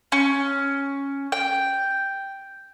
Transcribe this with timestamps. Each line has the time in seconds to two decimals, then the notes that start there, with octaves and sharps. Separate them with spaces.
0.12 C#4
1.32 G5